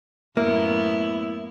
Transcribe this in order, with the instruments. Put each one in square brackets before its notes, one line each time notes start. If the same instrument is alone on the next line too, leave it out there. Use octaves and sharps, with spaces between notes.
[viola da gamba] F#2 A2 B3 [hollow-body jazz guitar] A#3 [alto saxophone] E4